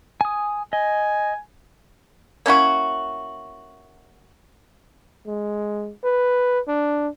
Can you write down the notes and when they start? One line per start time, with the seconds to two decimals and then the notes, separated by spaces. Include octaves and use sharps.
0.21 G#5 D#6
0.73 D#5 G#5
2.46 A#3 C#4 E4 F#4
5.27 G#3
6.04 B4
6.68 D4